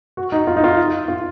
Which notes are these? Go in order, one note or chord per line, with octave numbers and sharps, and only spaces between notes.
F#4
D#4
F4
D#4
F4
F4